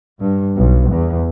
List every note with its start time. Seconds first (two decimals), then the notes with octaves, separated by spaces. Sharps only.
0.19 G2
0.58 B1
0.93 E2